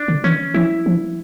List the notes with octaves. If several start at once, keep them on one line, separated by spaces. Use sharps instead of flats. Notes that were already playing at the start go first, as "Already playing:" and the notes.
Already playing: D4
D3
E3 C#4
F3 E4
F3